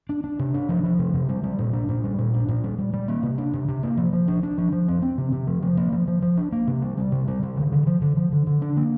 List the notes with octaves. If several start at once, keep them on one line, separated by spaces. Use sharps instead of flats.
D4
D4
C3
D4
F3
F3
C3
C3
G3
G3
A#2
D4
A#2
G3
A#2
D4
A#2
G3
G3
G3
A#3
C3
D4
C3
C3
A#3
F3
F3
D4
D4
F3
F3
C4
C4
C3
C3
F3
F3
A#3
F3
F3
F3
D4
A#3
C3
G3
G3
C3
G3
C3
D3
D3
F3
D3
F3
D3
D3
D4
A#3